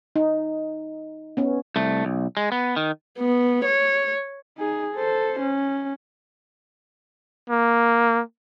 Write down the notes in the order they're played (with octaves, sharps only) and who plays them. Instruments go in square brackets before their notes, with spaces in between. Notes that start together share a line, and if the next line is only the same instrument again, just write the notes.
[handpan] D#4
B3 C#4
[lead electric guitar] C2 A3
B1
G#3
B3
D#3
[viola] B3
C#5
[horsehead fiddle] D#4 G#4
A4 C5
C#4
[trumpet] A#3